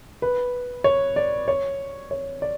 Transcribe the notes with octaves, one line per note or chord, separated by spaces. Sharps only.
B4
C#5
D5
C#5
C#5
D5